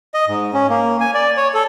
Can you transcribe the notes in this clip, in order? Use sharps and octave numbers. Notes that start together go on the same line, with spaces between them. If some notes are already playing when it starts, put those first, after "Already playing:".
D#5
G#2
C#4
A#3
G#5
D5
C#5
A4